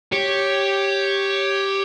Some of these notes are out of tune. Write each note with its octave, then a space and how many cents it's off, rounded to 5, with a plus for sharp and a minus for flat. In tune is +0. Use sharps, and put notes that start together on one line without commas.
G4 +0 C#5 +0